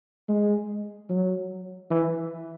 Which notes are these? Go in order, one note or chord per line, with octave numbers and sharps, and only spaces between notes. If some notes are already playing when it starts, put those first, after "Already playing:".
G#3
F#3
E3